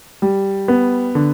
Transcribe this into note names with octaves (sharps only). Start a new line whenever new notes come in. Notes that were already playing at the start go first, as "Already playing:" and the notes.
G3
B3
D3